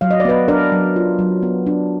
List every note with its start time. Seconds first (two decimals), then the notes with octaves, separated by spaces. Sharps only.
0.01 F#3 F5
0.11 D#5
0.20 D5
0.25 B3 B4 D#5
0.48 D4 A#4 D5
0.72 F#3
0.96 F4
1.19 F#3
1.42 B3
1.67 D4